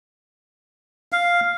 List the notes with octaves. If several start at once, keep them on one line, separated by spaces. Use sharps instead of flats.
F5